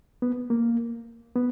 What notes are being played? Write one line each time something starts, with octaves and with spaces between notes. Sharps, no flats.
B3
A#3
B3